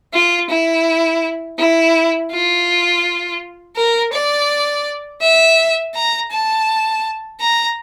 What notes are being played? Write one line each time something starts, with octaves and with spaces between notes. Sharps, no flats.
F4
E4
E4
F4
A#4
D5
E5
A#5
A5
A#5